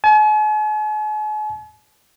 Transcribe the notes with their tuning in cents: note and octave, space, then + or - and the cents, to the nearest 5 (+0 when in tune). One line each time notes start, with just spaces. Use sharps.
G#5 +45